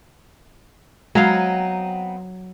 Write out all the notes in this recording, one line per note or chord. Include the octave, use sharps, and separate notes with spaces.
F#3 G#3 B3 C4 D#4 F5